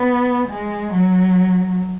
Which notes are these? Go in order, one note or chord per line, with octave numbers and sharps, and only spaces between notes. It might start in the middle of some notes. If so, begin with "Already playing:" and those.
Already playing: B3
G#3
F#3